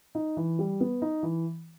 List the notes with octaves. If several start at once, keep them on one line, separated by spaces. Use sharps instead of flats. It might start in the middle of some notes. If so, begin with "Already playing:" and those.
D#4
E3
G3
B3
D#4
E3